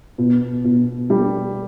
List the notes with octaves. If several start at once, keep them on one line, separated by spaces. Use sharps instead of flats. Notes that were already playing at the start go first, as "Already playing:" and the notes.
B2
B2
G3